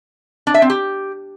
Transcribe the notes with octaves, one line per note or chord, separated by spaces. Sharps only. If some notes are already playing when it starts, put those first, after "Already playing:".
D4
E5
C4
G4